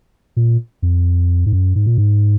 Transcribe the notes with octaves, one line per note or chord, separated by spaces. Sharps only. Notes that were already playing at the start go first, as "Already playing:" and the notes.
A#2
F2
G#2
F#2
G#2
A#2
G#2